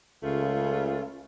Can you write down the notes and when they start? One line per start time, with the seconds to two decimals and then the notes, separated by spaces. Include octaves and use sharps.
0.23 C#2 C#3 A3 F4